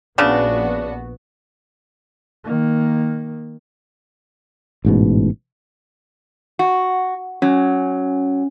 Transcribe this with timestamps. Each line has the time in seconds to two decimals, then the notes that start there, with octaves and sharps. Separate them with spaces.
0.18 A#1 C#3 B3 D4 F#4
2.44 D#3 A#3
4.85 A1 G#2 B2
6.59 F#4
7.42 F#3 C#4